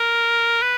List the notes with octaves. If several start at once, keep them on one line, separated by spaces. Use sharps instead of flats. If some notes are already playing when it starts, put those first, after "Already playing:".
Already playing: A#4
B4